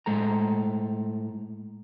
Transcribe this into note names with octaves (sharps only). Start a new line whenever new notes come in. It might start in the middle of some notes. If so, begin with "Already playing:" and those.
A2 G#3 A4 A#5